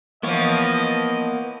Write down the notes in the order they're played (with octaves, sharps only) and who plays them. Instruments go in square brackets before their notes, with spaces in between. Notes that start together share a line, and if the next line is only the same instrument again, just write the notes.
[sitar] E3 F3 [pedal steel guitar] A#3 B3 C#5 [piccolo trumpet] D#5